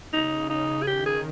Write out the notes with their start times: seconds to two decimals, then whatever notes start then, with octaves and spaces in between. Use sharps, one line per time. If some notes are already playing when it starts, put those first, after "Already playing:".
0.13 C#3 D#4
0.50 D#4
0.83 G#4
0.87 D#3 G4
1.06 G#4